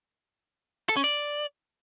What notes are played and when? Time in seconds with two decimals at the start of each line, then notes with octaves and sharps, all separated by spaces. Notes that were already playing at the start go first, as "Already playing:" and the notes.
0.89 A4
0.96 C#4
1.04 D5